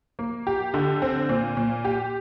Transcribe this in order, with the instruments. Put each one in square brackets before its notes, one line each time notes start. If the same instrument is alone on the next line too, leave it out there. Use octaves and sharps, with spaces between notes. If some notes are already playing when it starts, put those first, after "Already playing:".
[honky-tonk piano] A#3
G4
D3
C4
A#2
A#2
G4